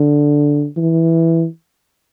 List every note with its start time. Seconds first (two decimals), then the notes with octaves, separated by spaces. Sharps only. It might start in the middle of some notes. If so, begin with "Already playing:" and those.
Already playing: D3
0.77 E3